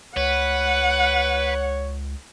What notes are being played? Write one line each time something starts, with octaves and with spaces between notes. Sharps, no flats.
C#2 B4 C#5 F#5